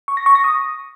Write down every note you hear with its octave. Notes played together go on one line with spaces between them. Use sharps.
C#6
A#6
C#6
A#6
D#6